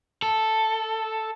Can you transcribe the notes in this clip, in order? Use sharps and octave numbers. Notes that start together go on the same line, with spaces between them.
A4